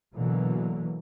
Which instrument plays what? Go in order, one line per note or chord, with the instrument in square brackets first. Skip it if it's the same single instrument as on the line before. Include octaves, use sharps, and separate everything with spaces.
[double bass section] B2 D3 E3 F#3 A#3